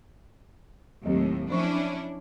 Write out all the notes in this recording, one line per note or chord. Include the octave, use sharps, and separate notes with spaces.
D#2 A2 F#3 C4 G4
F3 C#4 D4 E4 C5 C#6